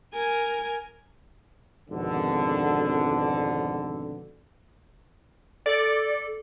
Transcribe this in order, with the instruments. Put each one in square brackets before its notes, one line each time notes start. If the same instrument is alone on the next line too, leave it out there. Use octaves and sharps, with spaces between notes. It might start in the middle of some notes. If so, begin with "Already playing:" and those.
[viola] A#4 G#5
[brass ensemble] G#1 F2 B2 D3
[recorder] A4 [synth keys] D5